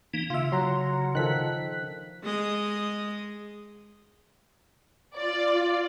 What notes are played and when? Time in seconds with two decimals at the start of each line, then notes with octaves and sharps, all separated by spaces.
0.14 E3 A#3 D#4
0.30 C#3 F4 E5
0.52 F#3 F#5 A#5 C6
1.15 D#3 F3 A4 F#6 B6
2.23 G#3 D#5
5.15 F4 D5